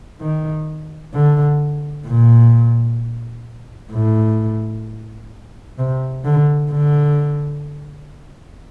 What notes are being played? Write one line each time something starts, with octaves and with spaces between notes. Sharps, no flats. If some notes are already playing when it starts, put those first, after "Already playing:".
D#3
D3
A#2
A2
C3
D3
D3